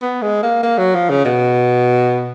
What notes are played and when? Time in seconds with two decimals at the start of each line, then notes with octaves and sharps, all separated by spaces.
0.02 B3
0.22 G#3
0.43 A#3
0.63 A#3
0.78 F#3
0.95 F3
1.10 C#3
1.25 B2